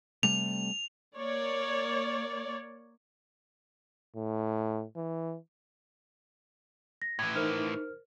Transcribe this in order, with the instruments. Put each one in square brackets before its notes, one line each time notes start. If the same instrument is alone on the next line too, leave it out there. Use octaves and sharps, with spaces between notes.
[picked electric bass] C3 G3 A3 [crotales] F7
[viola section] A#3 C#5 D5
[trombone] A2
E3
[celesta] A#6
[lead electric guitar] A2 E3 [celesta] G#6
[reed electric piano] D#4 [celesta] A#4 C5 F6